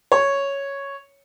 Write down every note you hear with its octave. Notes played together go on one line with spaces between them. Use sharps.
C#5